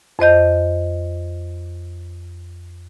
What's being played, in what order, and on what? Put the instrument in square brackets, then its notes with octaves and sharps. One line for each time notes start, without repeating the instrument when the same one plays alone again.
[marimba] F2 C5 D#5 G6